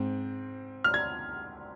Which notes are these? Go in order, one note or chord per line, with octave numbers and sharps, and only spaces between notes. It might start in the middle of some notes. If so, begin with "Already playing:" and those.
Already playing: G#2 C4
F6
G#6